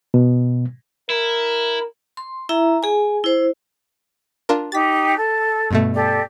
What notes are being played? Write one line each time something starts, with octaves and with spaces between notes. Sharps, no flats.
B2
E4 A#4
C6
E4 E5 A#5
G#4 G#5
E4 C5
D4 F4 A#4
D#4 G4 A6 B6
A4
G2 B2 A3
G4 A4 D5